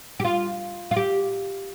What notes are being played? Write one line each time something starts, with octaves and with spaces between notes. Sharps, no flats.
G4
F4
F4
G4